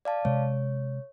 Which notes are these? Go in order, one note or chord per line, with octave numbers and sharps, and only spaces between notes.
D5 F5 A5
C3 G#3 C#5